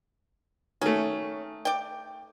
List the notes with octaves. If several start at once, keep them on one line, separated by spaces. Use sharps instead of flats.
D#3 A3 C#4
D5 G5